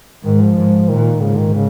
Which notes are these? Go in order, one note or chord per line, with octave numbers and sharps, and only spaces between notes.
G#2 D#3
F3
G#2
A#2 D#3
G#2 C#3
D#3
C#3